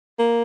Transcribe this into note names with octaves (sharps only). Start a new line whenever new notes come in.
A#3